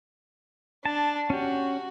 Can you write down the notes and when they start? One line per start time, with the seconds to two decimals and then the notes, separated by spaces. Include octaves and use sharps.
0.85 D4 A5
1.30 C#4 F#4 G4